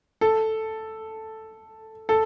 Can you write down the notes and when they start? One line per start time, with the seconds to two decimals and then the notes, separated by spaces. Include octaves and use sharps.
0.21 A4
2.09 A4